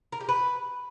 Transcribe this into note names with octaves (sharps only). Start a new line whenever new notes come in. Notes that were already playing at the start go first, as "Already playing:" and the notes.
A#4
G4
B4